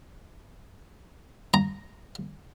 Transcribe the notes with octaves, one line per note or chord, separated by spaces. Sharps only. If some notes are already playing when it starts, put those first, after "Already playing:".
A#5